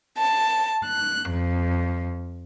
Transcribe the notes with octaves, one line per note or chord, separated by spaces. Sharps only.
A5
F#6
F2